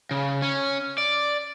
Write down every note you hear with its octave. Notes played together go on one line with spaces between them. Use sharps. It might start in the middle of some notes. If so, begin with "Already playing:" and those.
C#3
C#4
D5